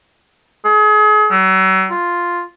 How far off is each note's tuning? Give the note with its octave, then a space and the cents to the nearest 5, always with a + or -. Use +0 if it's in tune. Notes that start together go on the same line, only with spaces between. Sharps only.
G#4 +35
F#3 +40
F4 +0